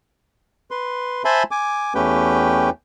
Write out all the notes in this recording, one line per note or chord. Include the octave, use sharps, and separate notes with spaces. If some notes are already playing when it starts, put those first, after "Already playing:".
B4 C6
C5 E5 G#5 A5 B5 C6
G#5 D6
E2 A3 C#4 G4 B4 G5